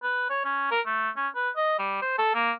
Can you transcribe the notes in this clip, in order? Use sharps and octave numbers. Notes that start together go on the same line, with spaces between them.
B4
C#5
C#4
A#4
A3
C#4
B4
D#5
G3
C5
A4
A#3